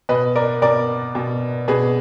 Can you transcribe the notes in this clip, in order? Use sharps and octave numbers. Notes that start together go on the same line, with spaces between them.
B2 B4 D#5
A#4 D5
B2 A#4 D5
B2
B2 G#4 B4